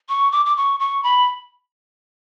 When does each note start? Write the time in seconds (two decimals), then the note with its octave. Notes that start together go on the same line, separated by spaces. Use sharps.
0.09 C#6
0.32 D6
0.46 D6
0.57 C#6
0.80 C#6
1.03 B5